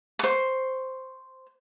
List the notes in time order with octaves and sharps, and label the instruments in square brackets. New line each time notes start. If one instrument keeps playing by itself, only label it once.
[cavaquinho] C5 C#6